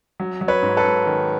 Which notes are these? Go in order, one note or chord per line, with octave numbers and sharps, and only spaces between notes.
F#3
F#3
B4 C#5
G#2
A4 B4
G#2
D#3